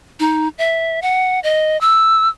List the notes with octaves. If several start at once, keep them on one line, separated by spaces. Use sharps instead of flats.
D#4
E5
F#5
D#5
E6